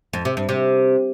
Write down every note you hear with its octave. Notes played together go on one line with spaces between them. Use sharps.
F2
C3
G2
C3